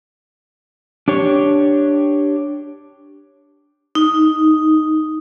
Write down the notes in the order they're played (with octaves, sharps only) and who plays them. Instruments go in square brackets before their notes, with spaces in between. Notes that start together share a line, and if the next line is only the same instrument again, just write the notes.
[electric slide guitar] D4 G4 C#5
[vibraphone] D#4